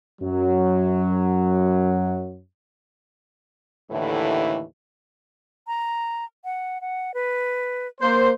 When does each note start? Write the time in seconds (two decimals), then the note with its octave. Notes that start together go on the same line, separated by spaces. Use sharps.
0.22 F#2 F#3
3.91 D#2 A2 D3 E3
5.67 A#5
6.45 F#5
6.81 F#5
7.14 B4
8.01 A#3 C5